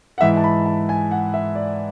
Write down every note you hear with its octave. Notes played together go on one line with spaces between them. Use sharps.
F#5
G#2 E3 E5
A5
B5
A5
G#5
F#5
E5
D5